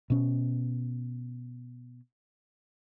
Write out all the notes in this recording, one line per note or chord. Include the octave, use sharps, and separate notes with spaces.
B2 C#4